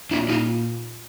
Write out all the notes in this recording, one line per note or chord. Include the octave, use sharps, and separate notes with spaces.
A#2 D4 E4
A#2 D#4 F4